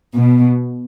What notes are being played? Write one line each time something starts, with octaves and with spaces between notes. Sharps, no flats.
B2